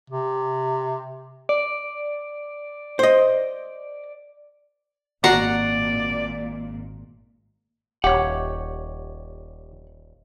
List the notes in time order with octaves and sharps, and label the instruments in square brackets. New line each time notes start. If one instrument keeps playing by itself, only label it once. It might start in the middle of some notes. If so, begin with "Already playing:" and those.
[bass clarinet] C3
[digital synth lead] D5
[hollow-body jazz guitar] C5 D#5
[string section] G#1 A#2 [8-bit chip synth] F#4 A#5 C7 [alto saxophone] D5 [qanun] F#5
[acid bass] D#1 [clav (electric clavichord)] G4 C#5 [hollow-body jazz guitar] F#5